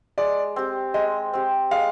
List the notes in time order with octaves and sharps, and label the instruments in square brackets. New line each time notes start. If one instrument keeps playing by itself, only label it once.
[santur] G#3 [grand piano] D5
[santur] C4 G4
[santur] G#3 [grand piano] D#5
[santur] C4 G4
[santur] G#3 [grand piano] F5